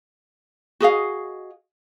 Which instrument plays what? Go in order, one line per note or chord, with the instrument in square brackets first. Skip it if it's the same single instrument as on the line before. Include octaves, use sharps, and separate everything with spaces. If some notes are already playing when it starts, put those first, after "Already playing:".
[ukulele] F#4 G#4 D#5 F5